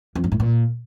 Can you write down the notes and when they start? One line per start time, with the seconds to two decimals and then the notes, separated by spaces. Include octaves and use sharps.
0.15 F2
0.24 G2
0.32 A2
0.40 A#2